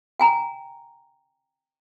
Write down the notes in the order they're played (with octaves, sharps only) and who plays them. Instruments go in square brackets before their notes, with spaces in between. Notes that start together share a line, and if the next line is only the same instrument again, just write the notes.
[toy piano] G5 G#5 A#5